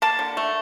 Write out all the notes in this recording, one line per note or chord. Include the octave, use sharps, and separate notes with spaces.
A#3 A5
D3
A3